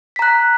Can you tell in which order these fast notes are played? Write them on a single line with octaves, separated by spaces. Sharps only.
B6 A#5 F#6